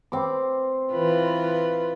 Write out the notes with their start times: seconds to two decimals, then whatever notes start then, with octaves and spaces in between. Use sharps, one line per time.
0.12 C4 D6
0.93 E3 F4 B4